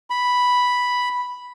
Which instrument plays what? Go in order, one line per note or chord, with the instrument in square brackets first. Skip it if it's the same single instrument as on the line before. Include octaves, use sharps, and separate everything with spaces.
[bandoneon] B5